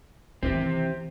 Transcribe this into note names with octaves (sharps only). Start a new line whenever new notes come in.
C3 D#3 E3 C4